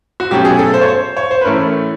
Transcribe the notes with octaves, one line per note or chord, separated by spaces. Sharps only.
F#4
B2 F#3 A3 C#4 G4
G#4
A4
C5
C#5
C5
C#5
C5
B4
A2 E3 A3 C#4 A#4